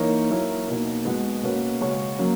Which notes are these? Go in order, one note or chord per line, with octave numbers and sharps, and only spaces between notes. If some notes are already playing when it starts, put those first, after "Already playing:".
Already playing: E3 A#3 D#4 A#4 C#5
F#3 A#3 E4 A#4 C#5
B2 A#3 D#4
B2 G#3 B3 F#4
B2 A#3 C#4 F#4 B4
C#3 G#3 C#4 F#4 C#5
F#3 A#3 C#4